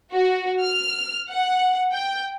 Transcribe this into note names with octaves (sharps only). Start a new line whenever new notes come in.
F#4
F6
F#5
G5